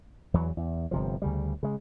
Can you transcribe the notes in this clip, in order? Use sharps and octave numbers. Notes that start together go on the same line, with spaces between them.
E2 E3 F#3
E2
G1 C3 F3
D2 C#3 G3
C#3 G#3